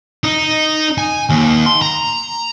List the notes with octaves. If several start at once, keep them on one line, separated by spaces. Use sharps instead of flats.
D#4
G#5
D#2
C6
A#5